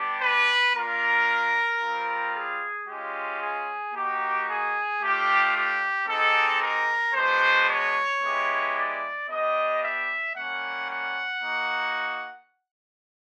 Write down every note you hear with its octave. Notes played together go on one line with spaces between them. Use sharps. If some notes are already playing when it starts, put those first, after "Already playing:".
Already playing: G3 B3 D4 G4
B4
A#3 D4 F4 A#4
G3 C4 F4
G#4
G#3 C#4 F4 G4
G#4
A#3 D#4 F#4 G4
G#4
A3 D4 F4 G4
G4
G#3 C4 D#4 G4 A4
A#4
G#3 B3 D4 F#4 C5
C#5
G#3 B3 E4 G4
D5
B3 D4 G4 D#5
E5
G3 A#3 C#4 F#5
F#5
A#3 D#4 F#4